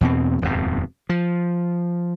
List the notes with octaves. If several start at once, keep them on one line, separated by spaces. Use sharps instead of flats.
E2 B2 C4
D#1 F2 G#2 B2
F3